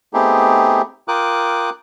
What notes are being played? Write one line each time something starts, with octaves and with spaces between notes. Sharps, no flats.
A3 B3 C4 D#4 G4 G#4
F4 A#4 G5 D6 D#6 F#6